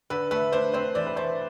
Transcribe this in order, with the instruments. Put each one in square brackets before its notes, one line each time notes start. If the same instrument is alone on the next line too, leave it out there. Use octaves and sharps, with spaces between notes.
[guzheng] D3 [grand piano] B4
[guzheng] A3 [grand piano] B4
[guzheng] D4 [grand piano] C5
[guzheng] C4 [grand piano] C5
[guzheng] E3 [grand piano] D5
[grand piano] B4
[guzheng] A3 [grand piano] C5